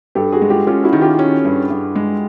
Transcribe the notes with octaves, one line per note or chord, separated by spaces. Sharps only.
G2 G4 A4
F#4 G#4
G#3
F4 G4
C#4 F4 G4
E4 F#4
D#3
F4 G4
C#4
G2
G2
G#3